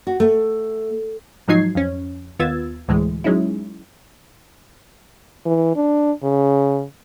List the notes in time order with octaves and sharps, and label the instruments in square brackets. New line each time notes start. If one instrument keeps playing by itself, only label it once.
[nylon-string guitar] F#4
A3
[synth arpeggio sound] G#2 F3 F#3 D#4 G#6 C7
F2 C#4
D#2 B3 F4 E6 G#6 A6
D2 A2 E3 G#3
F#3 G#3 C#4 D#4 E4
[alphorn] E3
D4
C#3